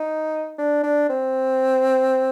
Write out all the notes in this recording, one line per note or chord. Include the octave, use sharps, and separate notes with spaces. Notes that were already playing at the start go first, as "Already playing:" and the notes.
Already playing: D#4
D4
D4
C4